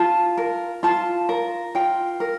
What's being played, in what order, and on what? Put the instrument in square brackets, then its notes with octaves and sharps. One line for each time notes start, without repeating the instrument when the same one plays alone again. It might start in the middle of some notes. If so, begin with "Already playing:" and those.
Already playing: [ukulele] F4 A5
A#4
F4 A5
A#4
F4 G5
A#4